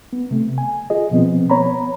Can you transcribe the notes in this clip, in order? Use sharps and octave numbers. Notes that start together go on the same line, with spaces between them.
B3
C3 A3
G#5
F4 G#4 D#5
B2 F3 B3 C4
B3 C#5 A#5 B5